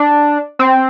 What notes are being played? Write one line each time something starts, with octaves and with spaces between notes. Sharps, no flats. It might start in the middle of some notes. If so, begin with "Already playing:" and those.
Already playing: D4
C4